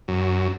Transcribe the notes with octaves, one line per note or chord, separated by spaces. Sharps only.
F#2